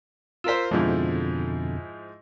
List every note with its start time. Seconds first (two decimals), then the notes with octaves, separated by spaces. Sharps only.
0.44 F4 A#4 C5 E6 B6
0.71 F2 G#2 B2 D3 F3 E4